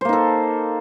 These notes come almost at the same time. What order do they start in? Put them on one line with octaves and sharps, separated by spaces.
C5 A#3 D#4 A4